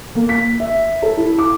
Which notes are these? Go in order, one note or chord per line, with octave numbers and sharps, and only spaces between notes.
A#3
B6
E5
A4
E4
D6